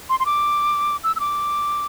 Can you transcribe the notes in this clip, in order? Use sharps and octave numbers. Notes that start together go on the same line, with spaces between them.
C6
C6
D6
E6
E6
D6